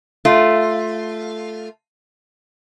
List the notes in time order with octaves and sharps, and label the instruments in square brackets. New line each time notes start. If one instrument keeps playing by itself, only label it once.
[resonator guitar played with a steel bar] A3 F4